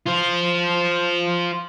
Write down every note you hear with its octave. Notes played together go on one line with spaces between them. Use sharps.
F4 C5